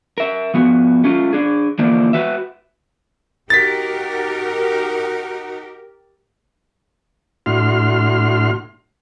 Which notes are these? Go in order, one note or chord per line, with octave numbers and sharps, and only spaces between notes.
A#4 E5
F3 B3 F#4
A3 C#4 F4
D4 G#4
D3 E3 F3 A#3 D4
F#4 B4 E5
D#4 F#4 G4 A#4 A6 B6
A2 D4 E4 F#4 C6 F6